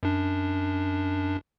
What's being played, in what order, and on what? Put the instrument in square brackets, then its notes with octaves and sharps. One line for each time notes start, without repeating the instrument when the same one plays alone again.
[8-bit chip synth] F#2 D4